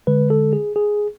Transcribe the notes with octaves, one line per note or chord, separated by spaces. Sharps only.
D3 G#3 B4
A4
G#4
G#4